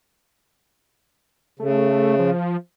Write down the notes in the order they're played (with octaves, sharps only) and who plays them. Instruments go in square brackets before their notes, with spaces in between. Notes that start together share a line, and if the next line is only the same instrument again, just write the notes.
[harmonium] C#3 [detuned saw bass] A3
[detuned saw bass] F3